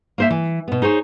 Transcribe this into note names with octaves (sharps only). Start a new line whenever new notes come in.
A#3 C5 E5
E3
B2 B3
D#4 G#4 C5 C#5